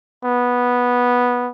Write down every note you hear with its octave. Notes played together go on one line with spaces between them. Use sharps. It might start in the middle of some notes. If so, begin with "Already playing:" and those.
B3